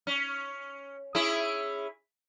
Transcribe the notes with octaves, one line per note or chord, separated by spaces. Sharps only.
C#4
C#4 E4 G#4